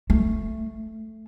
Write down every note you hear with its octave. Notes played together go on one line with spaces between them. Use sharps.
A3